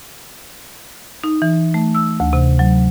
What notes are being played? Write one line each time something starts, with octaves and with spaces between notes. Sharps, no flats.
D#4
E3
A3
E6
D2
C3
F#3